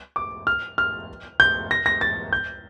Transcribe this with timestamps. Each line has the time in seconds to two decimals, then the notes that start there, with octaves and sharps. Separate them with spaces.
0.16 D6
0.47 F6
0.78 F6
1.40 G6
1.71 A#6
1.86 A#6
2.01 A6
2.33 G6